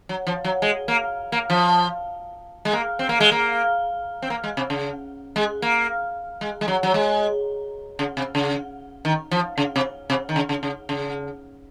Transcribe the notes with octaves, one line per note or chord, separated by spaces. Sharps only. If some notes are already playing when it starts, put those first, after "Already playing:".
F#3
F3
F#3
G#3
A#3
A#3
F3
G#3
A#3
C4
A#3
G#3
A#3
C4
A#3
G#3
C3
C#3
G#3
A#3
G#3
G#3
F#3
F#3
G#3
C#3
C3
C#3
D#3
F3
C#3
C3
C3
D#3
C#3
C#3
C#3
C#3